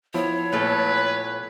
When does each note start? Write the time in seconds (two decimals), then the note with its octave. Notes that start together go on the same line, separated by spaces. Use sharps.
0.14 F3 B3 E4 C#5
0.52 A#2 A3 A4 B4